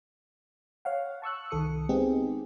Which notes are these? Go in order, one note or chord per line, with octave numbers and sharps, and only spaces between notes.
C#5 F5 F#5
A5 C#6 E6 F#6
C2 D#3 A4 D#6 C#7
G#3 B3 C4 D#4 G4 G#4